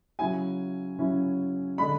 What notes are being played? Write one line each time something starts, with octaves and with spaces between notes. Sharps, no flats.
C#3 F#3 C#4 E4 G#5
C#3 F#3 C#4 E4
D3 G#3 D4 B5